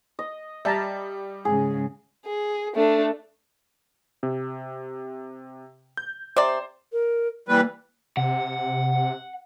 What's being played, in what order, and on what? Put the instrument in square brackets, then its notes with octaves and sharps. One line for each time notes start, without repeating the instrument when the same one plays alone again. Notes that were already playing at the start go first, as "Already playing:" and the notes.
[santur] D#5
[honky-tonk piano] G3 [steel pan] E5 A5 A#5
[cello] G#2 C#3 [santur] G#4
[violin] G#4
A3 D4
[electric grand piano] C3
G6
[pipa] C3 D5 [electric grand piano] C5
[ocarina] A#4
[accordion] E3 G3 B4 [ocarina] A#3
[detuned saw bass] C3 [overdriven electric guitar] F#5